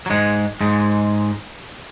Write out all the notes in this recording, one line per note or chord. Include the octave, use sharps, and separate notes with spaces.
F#3
G#2 G#3
G#2 G#3